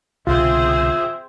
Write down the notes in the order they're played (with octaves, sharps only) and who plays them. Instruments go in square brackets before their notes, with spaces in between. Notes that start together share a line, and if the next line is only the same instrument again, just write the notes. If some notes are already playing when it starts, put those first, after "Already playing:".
[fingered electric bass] C2 B2 D3 [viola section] C4 G#4 C5 [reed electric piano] F4 [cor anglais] E5